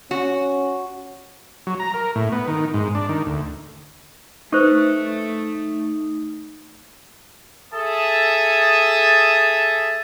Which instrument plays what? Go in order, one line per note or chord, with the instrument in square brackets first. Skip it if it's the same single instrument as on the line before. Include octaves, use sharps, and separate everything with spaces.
[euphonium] C#4 [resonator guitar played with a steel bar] F#4
[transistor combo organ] F#3
A#5
A#4
A2
B3
D#3
G#2
D4
D#3
D2
[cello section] A3 [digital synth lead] D#4 [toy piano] B4 C5 C#6
[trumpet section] G#4 A4 E5 A5 D#6